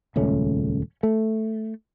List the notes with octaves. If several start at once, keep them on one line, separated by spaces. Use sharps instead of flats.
D#1 C#2 A3 C#4
A3